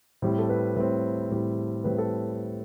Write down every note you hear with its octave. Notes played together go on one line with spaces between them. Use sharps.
A2 G3 C4 C5
A4
B4
A2 G3 C4 B4
A2 G3 C4
A2 G3 C4 B4
A4